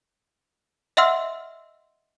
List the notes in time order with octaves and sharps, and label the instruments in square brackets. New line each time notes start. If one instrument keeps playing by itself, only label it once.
[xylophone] D#5 E5 F#5 C6 E6 F6